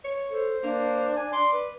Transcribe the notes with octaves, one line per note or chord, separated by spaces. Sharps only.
C#5
A4 C5
A#3 D4
G#5
D5 C6
B4